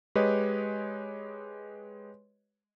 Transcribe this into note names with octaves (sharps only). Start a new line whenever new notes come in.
G#3 G4 B4 C#5 D#5